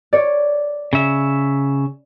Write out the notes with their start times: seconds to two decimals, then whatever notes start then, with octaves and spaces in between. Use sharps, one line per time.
0.13 C#5 D5
0.93 C#3 E5